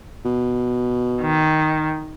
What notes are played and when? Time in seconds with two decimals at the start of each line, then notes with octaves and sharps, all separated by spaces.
0.25 B2
1.22 D#3